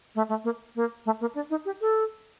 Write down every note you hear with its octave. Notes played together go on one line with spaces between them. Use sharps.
A3
A3
A#3
A#3
A3
A#3
D4
D#4
G4
A4